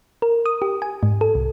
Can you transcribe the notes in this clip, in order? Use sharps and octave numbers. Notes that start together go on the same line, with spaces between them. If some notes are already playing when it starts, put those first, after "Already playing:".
A#4
D#6
G4
G#5
G#2
A4
C2